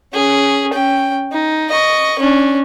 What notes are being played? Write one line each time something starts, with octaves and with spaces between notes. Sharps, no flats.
C#4 G#4
C#4 G5
D#4
D#5 C#6
C#4 D4